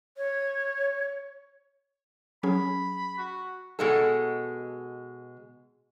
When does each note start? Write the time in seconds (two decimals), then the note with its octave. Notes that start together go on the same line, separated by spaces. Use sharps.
0.17 C#5
2.43 F#3 C#4 G#4 B5
3.18 F#4
3.79 B2 G#3 A4